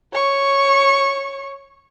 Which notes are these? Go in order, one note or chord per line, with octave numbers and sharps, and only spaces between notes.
C#5 C#6